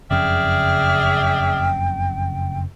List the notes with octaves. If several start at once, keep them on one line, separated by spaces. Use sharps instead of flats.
F#1 F2 C#3 G#4 D5 E5 G5 F6